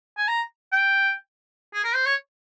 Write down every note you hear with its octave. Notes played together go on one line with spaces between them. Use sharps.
G#5
A#5
G5
G#4
A#4
C5
C#5